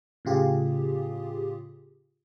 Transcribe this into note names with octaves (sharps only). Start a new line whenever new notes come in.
A2 C#3 F4 G4 G#4